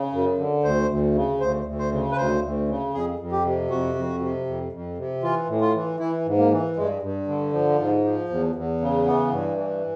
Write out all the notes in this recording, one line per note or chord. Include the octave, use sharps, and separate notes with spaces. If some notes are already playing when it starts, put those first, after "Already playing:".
Already playing: C#3
F#2
D3
D2 C5
D2
C#3
D2 C5
D2
C5
C#3
B4
D2 C5
D2
C#3
F2 G#4
F2
G4
C3
F2 F#4
F2
C3
F2
F2
C3
E3 F4
A2
F4
E3
E3 E4
G#2
A#3
E3
G2 G#3
G2
D3
F3
G#2
F3
E2
E2
C#3
E3 B3
G2
E3